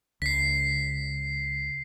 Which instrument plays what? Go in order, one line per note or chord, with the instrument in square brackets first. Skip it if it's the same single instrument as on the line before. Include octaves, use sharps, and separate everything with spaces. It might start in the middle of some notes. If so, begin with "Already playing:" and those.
[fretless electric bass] C#2 [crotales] B6 C7